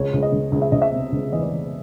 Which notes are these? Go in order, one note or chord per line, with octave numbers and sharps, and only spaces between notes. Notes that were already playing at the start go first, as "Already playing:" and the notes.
Already playing: C#2 C#5
C#2
D#5
C#2
C#2
E5
C#2 D#5
E5
C3
C#2
E3 D#5
D5
E3